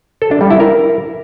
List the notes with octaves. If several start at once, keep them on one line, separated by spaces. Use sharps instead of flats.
A4
D4
G3
E4
A#4